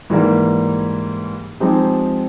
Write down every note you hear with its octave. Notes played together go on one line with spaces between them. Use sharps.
G#2 E3 G3 A#3
F3 G#3 C4 D#4 G4